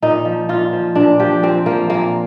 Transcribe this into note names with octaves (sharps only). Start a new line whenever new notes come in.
A#2 D#4
F3
A#2 F4
F3
A#2 D4
F3 G4
A#2 C4
F3 A#3
A#2 A#3